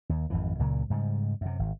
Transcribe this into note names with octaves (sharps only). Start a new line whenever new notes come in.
D#2
G#1 F2 E3
C#2 A#2 C#3 F#3
G#2 C#3 G3
F#2 C3
G#1